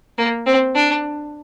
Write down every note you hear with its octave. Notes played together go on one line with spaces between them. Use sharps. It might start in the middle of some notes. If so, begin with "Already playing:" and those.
A#3
C4
D4